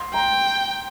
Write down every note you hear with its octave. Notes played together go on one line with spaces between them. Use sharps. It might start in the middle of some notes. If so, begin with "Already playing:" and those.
Already playing: C6
G5 A#5